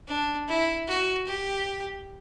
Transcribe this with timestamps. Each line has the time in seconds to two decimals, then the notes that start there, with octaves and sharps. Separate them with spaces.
0.08 D4
0.48 E4
0.88 F#4
1.27 G4